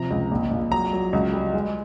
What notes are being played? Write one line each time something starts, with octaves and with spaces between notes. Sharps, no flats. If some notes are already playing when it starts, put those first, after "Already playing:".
Already playing: C3 F3 A#5
C#2
A#1
A#1
F#3 A#5
F#3
C#2
G3
G#3